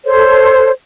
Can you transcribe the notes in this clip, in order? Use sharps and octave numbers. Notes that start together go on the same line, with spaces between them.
A4 C5 C#5